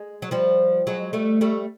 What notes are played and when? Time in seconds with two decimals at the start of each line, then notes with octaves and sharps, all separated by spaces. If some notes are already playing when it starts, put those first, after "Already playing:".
Already playing: G#3
0.22 F#3
0.31 F3 G3
0.87 F#3 G#3
1.13 G3 A3
1.41 G3 A3